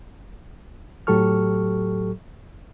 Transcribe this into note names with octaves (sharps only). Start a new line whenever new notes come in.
A2 F#3 G4 A4 C#6 F6